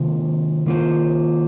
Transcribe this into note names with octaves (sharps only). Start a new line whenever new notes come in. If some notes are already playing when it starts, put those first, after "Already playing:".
Already playing: C3 D#3 A#3 F4 C5
D#3 A#3 F4 C5